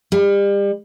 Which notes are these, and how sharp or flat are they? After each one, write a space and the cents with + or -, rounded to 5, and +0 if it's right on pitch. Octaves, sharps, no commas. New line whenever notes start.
G3 +35